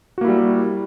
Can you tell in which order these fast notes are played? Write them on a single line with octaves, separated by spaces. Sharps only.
F#4 A#3 E4 G3